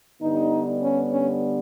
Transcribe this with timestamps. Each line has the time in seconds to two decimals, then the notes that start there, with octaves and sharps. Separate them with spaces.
0.22 G2 D3 G3 B3 D#4
0.81 C#4
1.10 C#4